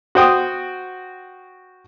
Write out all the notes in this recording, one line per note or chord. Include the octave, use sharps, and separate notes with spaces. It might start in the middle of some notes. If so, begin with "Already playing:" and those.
F#4 C5 G5 D#6